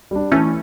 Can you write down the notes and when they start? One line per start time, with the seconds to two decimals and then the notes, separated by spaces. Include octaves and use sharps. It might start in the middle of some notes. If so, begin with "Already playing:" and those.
0.11 G3 D4
0.32 E3 A3 C#4